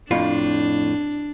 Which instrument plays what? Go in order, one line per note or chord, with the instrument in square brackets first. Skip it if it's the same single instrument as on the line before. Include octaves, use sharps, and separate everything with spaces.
[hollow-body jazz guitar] F2 A2 F4 [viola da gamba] D4